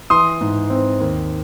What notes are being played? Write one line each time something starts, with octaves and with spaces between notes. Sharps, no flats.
E3 C6 D#6
G#2
C4
D#2